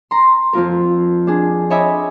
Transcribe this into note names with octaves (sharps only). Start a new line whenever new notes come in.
A#5 C6
F2 C4 F4 A#4
D4 G#4
C#5 D#5 E5 G#5 B5 D6